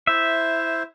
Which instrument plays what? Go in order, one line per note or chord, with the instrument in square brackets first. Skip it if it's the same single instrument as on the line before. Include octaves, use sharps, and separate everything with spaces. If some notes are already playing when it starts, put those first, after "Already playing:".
[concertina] E4 C5 [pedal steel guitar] E5